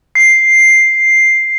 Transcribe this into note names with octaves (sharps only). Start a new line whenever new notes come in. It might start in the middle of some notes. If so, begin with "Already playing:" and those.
C7